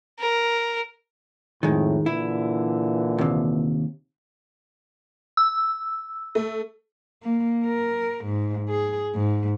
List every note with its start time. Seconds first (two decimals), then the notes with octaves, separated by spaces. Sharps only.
0.20 A#4
1.63 F2 A2 D#3 G#3
2.06 A#2 D3 E3 E4
3.18 D#2 C3
5.37 E6
6.35 A3
7.23 A#3
7.65 A#4
8.25 G#2
8.69 G#4
9.14 G#2